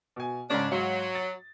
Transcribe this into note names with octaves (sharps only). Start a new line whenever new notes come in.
B2 G#5
G#2 C#3 C#4 D4
G#2 F#3 F5
A6